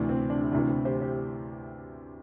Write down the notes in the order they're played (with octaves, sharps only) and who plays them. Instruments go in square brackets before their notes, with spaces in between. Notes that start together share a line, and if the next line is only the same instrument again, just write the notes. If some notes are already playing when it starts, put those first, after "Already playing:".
Already playing: [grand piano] D2 C3 E3 D4
C4
D4
E4
D2 C3 E3 D4
C4 E4
G4 C5
G4 C5